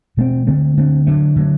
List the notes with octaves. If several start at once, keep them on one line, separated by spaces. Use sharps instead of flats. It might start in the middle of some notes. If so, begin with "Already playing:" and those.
B2 A3 C4
D3 A3 C4
D3 A3 C4
D3 F#3 A3
D3 F#3 A3